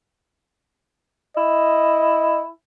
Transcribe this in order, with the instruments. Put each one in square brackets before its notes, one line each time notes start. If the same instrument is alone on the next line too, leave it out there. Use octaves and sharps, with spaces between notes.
[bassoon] E4 [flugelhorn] D#5